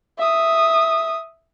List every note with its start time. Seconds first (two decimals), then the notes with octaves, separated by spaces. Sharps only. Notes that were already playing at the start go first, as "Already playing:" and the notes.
0.18 E5 D#6